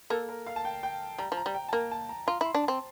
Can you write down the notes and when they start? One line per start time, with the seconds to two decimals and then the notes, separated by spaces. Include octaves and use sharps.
0.10 A#3 A4
0.29 A#4
0.47 F5
0.56 A5
0.65 G5
0.83 G5
1.18 G3 A#5
1.32 F3
1.37 A#5
1.46 G3
1.54 G5
1.68 A5
1.73 A#3 A#5
1.91 A5
2.09 A#5
2.27 F4 A#5
2.41 E4 C6
2.55 D4
2.63 A5
2.68 C4